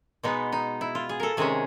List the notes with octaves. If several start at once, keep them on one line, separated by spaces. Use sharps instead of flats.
B2 G#3 B3 D#4
D#4
E4
F4
G#4
A4 A#4
C3 D#3 G#3 C#4 G#4